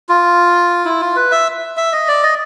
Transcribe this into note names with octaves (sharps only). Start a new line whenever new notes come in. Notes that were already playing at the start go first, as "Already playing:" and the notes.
F4
E4
F4
B4
E5
E5
D#5
D5
D#5